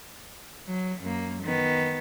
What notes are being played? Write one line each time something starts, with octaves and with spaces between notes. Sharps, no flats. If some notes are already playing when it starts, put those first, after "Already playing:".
F#3
F#2 A#3
D#3 B3